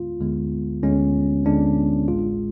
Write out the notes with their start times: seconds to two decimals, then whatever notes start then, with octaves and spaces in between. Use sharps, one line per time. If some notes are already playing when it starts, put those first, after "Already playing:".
Already playing: D2 D3 G#3 B3 F4
0.20 D2 D3 G#3 B3
0.83 D2 D3 G#3 B3 C#4
1.45 D2 D3 G#3 B3 D4
2.08 A1 A2 G#3 F4